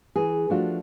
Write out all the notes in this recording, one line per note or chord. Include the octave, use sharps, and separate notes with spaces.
E3 G#4
F3 A3 D4 F4 F#4